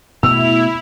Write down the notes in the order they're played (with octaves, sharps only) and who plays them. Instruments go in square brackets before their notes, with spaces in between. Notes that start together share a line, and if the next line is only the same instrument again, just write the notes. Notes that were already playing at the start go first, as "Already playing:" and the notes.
[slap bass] B2 A3 [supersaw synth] E4 [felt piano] E6 [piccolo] F7